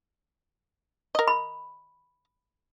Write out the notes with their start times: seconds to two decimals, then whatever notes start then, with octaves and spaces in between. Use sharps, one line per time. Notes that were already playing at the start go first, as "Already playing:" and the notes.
1.15 A#4 D#5
1.28 B5